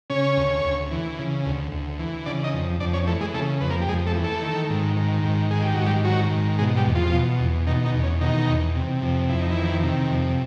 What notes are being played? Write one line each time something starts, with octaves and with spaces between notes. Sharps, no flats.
C#3 C#4 C#5
D2
D2
E3
C#3
D2
D2
E3
C#3 D4 D5
D#4 D#5
F2
F2 D4 D5
C#4 C#5
E3 A3 A4
G#3 G#4
C#3 A3 A4
F2 B4
A#3 A#4
G4
F2 G#3 G#4
A3 A4
E3
A3 A4
D#3
G#2
D#3
G#2
D#3 G#4
G4
G#2 F#4
G3 G4
D#3 F#3 F#4
G#2
B2 G#3 G#4
G3 G4
E2
F3 F4
B2
E2
B2 D#3 D#4
D#3 D#4
E2
C#4
B2 D#3 D#4
E2
C3
F2
F2 E4
D#4
D#3 E3 E4
C3
F2